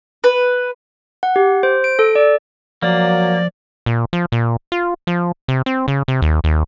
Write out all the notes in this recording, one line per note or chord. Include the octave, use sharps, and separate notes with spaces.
B4
F#5
G4
C5
D7
A4
D5
F3 F#3 A#3 D5
A#2
F3
A#2
F4
F3
C3
C4
C#3
C3
D#2
D#2